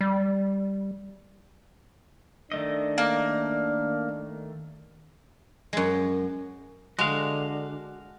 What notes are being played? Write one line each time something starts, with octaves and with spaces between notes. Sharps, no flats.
G3
D#3 A3 D4 D#5
A#3
F#2 G#3
D3 G#3 F#4 F5